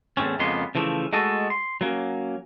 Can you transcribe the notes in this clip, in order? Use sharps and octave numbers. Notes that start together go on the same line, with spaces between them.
E2 A2 C#3 C4 C#4
F2 C#3 G#3 A#3 B3 C6
C#3 E3 F3 A3
G#3 A3 F#4 A4 D#5
C6
F#3 A#3 C#4